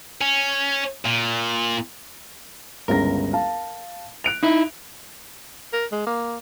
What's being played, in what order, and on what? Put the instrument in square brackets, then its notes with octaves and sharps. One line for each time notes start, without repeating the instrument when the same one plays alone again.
[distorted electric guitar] C#4
A#2
[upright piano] G1 C#2 A#6 [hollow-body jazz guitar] A#4
[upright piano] F5 A5
F#6 D7 F7
[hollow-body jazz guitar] D#4 E4
[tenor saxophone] A#4
G#3
A#3